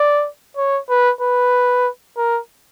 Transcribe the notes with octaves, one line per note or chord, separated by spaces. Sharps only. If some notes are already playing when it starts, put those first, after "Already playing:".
Already playing: D5
C#5
B4
B4
A#4